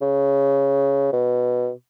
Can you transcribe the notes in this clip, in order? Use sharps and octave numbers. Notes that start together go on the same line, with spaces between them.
C#3
B2